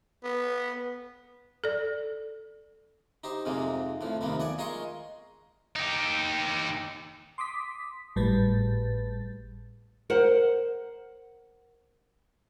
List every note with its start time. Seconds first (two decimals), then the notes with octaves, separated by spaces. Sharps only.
0.24 B3
1.64 A4 D5
3.24 D#4 G4 C5
3.45 F2 G#2 C3 G#3 A#3
4.01 F2 A2 F3
4.21 D#2 C3 F3 A#3 B3
4.40 D5 F#5 G#5
4.58 G#3 F4 A#4 G#5 C6 C#6
5.76 D#4 G4
7.38 C6 D6 D#6 B6
8.16 G#1 A2 G3 B4 A6
10.10 A#4 C5 F#5